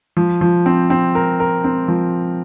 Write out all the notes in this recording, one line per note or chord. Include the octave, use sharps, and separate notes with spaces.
F3
F3
C4
C4
A#4
A#4
C4
F3